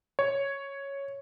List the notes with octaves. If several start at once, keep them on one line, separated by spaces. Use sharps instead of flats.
C#5